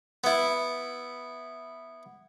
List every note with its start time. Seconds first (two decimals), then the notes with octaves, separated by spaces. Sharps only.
0.24 B3 E4